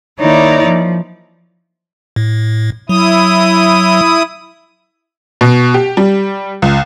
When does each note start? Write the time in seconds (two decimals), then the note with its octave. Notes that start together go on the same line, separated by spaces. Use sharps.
0.19 D#3 A#3 D#4 E4 C#5 D5
0.63 F3
2.16 A2
2.89 F#3 E4 D#6
5.41 B2
5.74 G4
5.97 G3
6.62 C#2